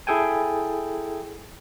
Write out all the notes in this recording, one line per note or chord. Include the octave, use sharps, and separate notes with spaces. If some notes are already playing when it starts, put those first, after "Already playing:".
E4 G#4 A4 G5 G#5